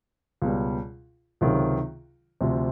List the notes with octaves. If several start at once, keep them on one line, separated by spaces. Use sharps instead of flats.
C#2 B2 G3
C#2 C3 D#3 F#3
D2 C3 F3